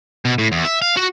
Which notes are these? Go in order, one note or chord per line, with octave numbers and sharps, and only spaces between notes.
B2
A2
E2
E5
F5
F#4